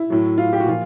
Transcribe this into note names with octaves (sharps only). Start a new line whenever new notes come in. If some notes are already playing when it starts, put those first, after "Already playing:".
Already playing: E4
A2 F#3
F4
G4
F#4
A#2 F3 F4